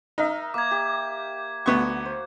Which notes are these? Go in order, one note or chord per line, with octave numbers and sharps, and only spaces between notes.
D#4 A#4 E5
A#3 D6 G#6
G4
D2 B3 F#4 C#6
C5